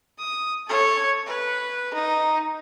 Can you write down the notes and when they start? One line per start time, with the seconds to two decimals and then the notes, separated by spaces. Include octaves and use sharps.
0.19 D#6
0.67 A4 C#5
1.26 B4
1.94 D#4